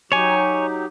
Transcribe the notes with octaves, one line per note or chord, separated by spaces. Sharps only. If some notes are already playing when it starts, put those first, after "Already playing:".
F#3 D#4 G4 C#5 G#5